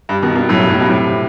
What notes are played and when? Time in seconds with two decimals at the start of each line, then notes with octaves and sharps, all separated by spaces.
0.09 G2
0.22 B2 D#3
0.35 G2 B2
0.49 F#2 A2
0.59 G2
0.69 F#2 A2
0.79 G2 B2
0.89 A2 C3